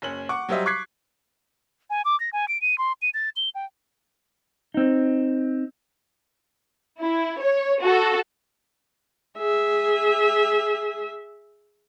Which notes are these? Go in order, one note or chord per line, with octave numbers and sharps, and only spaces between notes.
F#1 C#4 F#7
F#5 C#6 D6
F#3 G3 G4 C5 D#5 E5
C#6 D6 F#6 G#6 B6 C7
G#5
D6
A#6
G#5
D7
D#7
C6
D#7
A6
G7
G5
C4 D#4
E4
C#5
F#4 A4
G#4 E5